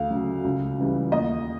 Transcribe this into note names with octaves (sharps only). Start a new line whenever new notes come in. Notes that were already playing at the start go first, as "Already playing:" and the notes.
Already playing: D2 F5
C#3 F#3
C#2
C#3 E3 G3
D#2 D#5